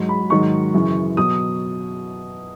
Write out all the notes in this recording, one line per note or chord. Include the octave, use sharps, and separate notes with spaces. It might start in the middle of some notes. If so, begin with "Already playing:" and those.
Already playing: G#2 F#3
B5
G#2 D#3 F#3 C#6
F#2 C#3 E3
B2 F#3 D#6